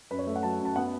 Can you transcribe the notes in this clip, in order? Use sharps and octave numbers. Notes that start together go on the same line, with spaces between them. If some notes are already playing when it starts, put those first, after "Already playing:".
F#2 B4
C#5
A3 E5
F#5
F#3 A5
F#2
A5
B3 F#5